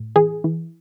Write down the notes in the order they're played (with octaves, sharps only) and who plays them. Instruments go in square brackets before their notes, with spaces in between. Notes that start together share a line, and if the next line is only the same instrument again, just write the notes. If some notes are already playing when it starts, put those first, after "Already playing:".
Already playing: [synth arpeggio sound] A2
E3 G#4
E3